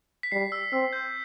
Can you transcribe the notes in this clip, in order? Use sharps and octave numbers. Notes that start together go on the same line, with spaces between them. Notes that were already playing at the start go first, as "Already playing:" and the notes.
B6
G3 C7
E6
C4 E6
G6